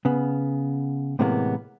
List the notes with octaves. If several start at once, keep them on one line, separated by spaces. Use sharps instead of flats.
C#3 B3
A2 C3 E3 G#3 A#3 B3